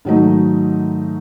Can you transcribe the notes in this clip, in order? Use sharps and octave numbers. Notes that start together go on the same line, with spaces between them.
G#2 D#3 F#3 A3 D#4